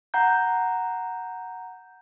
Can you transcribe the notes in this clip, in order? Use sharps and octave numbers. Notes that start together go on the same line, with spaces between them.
F#5 A#5 G6